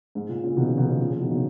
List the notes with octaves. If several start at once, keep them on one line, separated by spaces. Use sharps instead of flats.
G#2
A#2
A#2 C#3
B2 D#3
C#3 F3
B2 D#3
C#3 F3
C#3 F3
A#2 C#3
B2 D#3
B2 D#3